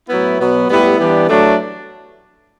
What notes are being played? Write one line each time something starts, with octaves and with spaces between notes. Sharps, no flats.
A2 F#3 B3 E4
B2 F#3 B3
A2 G3 B3 E4 G4
E3 G3 B3 D4 G4
A2 F#3 A3 D4